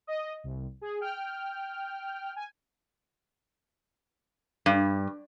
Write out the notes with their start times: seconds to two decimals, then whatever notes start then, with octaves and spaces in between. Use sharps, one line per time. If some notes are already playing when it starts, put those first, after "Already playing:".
0.07 D#5
0.44 C2
0.81 G#4
1.01 G5 F6
2.36 G#5
4.66 G2